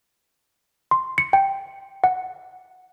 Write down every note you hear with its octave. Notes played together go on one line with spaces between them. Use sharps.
C6
C#7
G5
F#5